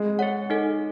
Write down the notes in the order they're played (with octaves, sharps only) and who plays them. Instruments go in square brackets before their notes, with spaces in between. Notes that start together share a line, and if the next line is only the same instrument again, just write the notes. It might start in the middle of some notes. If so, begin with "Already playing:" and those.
Already playing: [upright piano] G#3
[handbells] G#4 C#5 F#5
D#4 A4 D#5 G#5